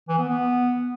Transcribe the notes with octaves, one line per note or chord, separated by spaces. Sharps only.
E3
B3
B3